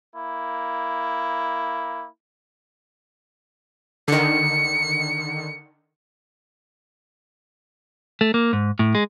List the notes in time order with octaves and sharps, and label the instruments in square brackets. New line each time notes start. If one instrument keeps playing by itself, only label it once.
[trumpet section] A#3 E4
[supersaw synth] D3 D#3 [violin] C#7
[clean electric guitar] A3
A#3
G#2
A2
G#3